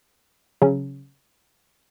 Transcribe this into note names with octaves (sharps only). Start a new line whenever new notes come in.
C#3 F#3 C#4